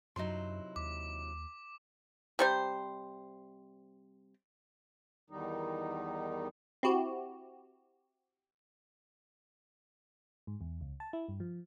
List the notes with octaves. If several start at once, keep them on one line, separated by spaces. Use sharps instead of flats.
F#2 C3 F#3 D#4 E4 C6
D#2 D6
C3 G3 C5
E2 D#3 G3 D#4
C4 E4 F#4 G4
G#2
E2
C#2
A5
E4
G2
F3